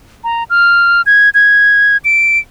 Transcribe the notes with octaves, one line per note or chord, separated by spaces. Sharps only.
A#5
F6
G#6
G#6
D7